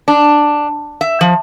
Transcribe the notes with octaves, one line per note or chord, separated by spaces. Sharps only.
D4
E5
F3